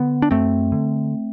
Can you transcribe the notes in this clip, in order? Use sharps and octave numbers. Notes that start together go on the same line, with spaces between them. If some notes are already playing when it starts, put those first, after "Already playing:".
Already playing: D3 B3
D4
F#2 A3 C4
D3